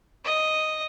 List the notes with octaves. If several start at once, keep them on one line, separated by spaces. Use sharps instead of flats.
D#5